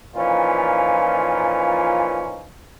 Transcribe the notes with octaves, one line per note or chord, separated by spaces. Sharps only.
A#2 E3 F3 C#4 D#4 F4